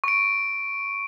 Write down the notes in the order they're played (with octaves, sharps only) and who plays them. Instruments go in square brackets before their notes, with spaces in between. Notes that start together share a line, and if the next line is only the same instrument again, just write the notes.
[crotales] C#6 D7